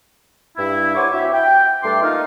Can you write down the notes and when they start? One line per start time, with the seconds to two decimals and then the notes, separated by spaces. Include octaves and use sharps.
0.57 G2 E4
0.96 C5 C#5 F#5 G#5 C#6 D6
1.12 C4 E4 F#4 G4 E5
1.33 G5
1.83 G2 G3 A3 D4 C6 D6
2.03 A#3 D#4 F4